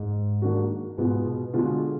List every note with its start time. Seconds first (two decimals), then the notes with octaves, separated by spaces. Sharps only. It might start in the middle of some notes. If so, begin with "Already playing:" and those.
Already playing: G#2
0.42 D#3 A#3 D4 F#4
0.97 G#2 B2 G#3 B3 F4
1.25 B2
1.53 B2 D3 G#3 B3 F4